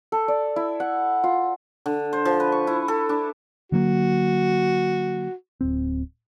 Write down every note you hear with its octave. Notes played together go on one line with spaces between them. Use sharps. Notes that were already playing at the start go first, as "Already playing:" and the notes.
A4
D5
E4
F#5
F4
D3
C5
F3
B4
C#6
E4
A4
D4
D3 F#3 A#3 F#4
D1 C4